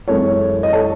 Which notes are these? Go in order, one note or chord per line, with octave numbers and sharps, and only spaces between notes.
F#2 E3 G#3 A4 C#5
D#5
A4 C#5